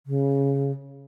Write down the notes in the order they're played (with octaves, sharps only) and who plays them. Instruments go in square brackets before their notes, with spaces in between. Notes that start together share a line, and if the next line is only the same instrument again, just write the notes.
[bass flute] C#3